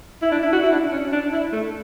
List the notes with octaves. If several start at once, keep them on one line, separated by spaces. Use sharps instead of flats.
E4
D4
E4
F#4
E4
D4
C#4
D4
E4
A3